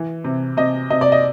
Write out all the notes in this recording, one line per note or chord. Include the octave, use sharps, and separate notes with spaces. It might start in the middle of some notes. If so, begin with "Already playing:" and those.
Already playing: E3
C3
C3 D#5
C3 D#5
D5
D#5